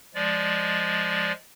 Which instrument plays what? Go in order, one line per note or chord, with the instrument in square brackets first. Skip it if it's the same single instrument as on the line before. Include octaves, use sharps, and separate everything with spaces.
[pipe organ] F3 G#3 D5